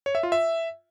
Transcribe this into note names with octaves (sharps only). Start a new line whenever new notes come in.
C#5
E5
F4
E5